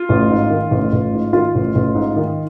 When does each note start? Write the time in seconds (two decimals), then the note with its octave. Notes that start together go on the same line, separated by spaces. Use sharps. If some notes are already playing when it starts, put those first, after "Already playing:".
Already playing: F4
0.09 A1
0.30 G#2
0.50 D#3
0.71 A1
0.92 A1
1.13 G#2
1.33 D#3 F4
1.55 A1
1.75 A1
1.95 G#2
2.16 D#3